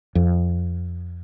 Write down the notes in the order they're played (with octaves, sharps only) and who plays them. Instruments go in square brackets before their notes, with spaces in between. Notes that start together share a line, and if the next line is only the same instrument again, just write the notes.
[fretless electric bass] F2